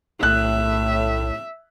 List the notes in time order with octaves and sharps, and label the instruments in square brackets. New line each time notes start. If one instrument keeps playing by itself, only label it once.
[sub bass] B1 [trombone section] A2 [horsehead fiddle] E5 [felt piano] F#6